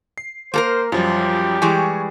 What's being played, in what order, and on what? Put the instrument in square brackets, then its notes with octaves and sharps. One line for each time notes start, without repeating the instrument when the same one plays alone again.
[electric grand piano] C7
[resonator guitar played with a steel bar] A#3 A4 A#4 [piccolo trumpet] C5
[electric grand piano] F#2 F3 G3 [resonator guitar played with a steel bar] F4 [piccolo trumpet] G4
[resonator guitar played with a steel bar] E3 G3 G#3 [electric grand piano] G#5 C#6